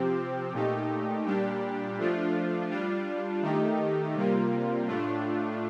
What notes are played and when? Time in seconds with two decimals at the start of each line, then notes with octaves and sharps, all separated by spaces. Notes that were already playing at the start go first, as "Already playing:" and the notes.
Already playing: C3 F3 C4 G4
0.53 A#2 A3 D#4 G4
1.25 A#2 G3 D4 G4
1.98 F3 A3 D4 F4
2.70 G3 D4 F4
3.42 D#3 A3 D#4 G4
4.14 C3 G3 A#3 F4
4.86 A2 A3 D4 F4